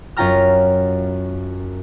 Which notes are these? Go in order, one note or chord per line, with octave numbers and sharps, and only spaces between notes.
F#2 C#4 F4 G5 A#5 F6